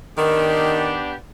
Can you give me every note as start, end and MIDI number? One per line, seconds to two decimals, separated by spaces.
0.18 0.97 51
0.18 1.15 59
0.18 1.15 62
0.18 1.15 67